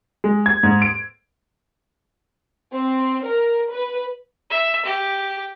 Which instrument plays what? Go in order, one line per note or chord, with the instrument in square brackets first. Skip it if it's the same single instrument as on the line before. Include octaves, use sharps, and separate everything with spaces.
[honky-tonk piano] G#3
G#6
G#2
D7
[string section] C4
A#4
B4
[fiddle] E5
G4